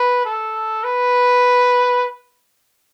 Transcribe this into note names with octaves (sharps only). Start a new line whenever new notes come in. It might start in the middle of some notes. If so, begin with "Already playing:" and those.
Already playing: B4
A4
B4